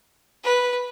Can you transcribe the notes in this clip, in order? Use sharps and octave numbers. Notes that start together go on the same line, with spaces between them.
B4